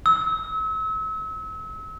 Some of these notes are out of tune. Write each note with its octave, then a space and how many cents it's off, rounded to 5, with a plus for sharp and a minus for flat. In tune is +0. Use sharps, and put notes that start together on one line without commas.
E6 -35